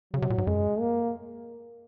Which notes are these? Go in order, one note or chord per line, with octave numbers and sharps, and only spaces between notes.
C#3 F#3
C3
A#2
G#2
F#2 G#3
A#3